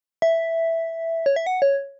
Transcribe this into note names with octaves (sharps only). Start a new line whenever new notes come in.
E5
C#5
E5
F#5
C#5